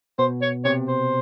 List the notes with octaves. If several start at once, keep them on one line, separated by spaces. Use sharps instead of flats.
B2 B3 C5
C#5
C3 C4 C#5
C5